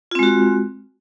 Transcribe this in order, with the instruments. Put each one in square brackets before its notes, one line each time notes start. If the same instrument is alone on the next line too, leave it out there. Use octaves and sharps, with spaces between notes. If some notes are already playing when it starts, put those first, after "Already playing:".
[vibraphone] F4
C4
G#3
F#4